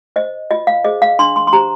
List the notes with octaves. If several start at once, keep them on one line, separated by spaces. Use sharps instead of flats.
C5 D#5
F4 D#5
F5
G#4 C5 D#5
F5
D4 C6
C6
C6
G4 C5 A#5